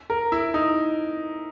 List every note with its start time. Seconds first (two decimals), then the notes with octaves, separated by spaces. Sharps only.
0.10 A#4
0.32 E4
0.54 D#4